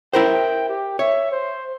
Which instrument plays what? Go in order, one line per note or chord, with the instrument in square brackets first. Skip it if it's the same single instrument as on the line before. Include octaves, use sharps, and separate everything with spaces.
[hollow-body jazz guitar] E4 A#4 C5 [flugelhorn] G5
[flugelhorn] G4
[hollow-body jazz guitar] C#5 [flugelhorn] E5
[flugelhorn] C5